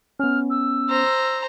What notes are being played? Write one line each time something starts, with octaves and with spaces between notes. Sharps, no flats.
B3 C#4 F6
E6
C5 A#5